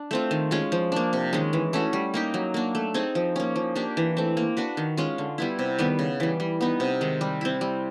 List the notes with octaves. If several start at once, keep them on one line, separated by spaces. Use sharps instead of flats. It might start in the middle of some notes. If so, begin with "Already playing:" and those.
Already playing: D4
A3 C4 F4
D#3
G#3 C#4 F4
F3
A#3 D4
C3
D#3 G#3 C#4
E3
A3 C#4 F#4
G3
A#3 D#4 G4
F#3
A#3 D4
A3
C4 D#4 G#4
F3
A#3 C#4
F3
A#3 D4 G4
E3
A3 C4
A#3
D4 F#4 B4
D#3
G#3 C#4 F4
D3
G3 B3 E4
C3
D#3 G3 B3
C#3
E3 G3
G3
B3 D#4
C3
D#3 G#3
G3
C4 E4
G3